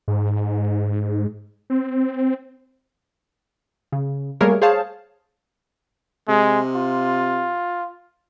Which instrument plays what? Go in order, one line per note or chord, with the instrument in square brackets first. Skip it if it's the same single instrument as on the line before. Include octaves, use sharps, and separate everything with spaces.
[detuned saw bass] G#2
C4
[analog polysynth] C#3
G3 A3 A#3 G#4 A#4 C#5
G#4 C5 C#5 F5 A5
[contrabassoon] C3 [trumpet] G#3
[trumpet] F4